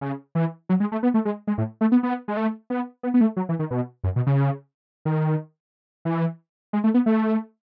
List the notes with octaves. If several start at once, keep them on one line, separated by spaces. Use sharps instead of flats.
C#3
E3
F#3
G#3
A3
B3
A3
G#3
G#3
A2
A3
B3
B3
G#3
A3
B3
B3
B3
A3
F#3
E3
D#3
B2
F#2
B2
C#3
D#3
E3
G#3
A3
B3
A3